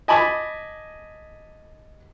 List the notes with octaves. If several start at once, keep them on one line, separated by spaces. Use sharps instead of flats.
D#5 G#5 A5 B5 D6